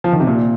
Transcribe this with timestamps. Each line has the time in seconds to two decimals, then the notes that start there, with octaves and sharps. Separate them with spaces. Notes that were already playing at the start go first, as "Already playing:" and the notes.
0.04 F3
0.13 D#3
0.20 C3
0.27 A#2